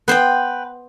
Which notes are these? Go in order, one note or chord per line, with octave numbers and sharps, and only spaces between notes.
B3 B4 C5 G5